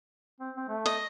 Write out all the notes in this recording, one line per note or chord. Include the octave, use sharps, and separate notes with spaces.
C4
C4
A3
D#5